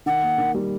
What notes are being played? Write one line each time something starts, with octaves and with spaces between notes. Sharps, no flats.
D#3 F#5
A#3
D#3
G3